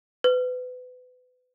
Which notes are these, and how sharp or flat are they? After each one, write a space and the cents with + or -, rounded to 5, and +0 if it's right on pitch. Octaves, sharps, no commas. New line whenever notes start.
B4 +30